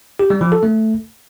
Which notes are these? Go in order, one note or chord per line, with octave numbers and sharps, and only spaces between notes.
G4
G3
F3
A4
A3